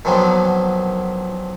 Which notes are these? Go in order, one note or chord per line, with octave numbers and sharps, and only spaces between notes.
A#2 D3 D#3 F3 F#3 B3